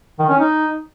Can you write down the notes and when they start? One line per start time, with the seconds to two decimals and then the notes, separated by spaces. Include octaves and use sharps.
0.19 D#3
0.29 C#4
0.39 D#4